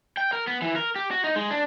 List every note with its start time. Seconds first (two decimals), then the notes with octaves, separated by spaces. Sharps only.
0.17 G5
0.33 A#4
0.47 B3
0.62 E3
0.76 A#4
0.96 G4
1.11 F#4
1.24 D#4
1.36 G#3
1.51 D4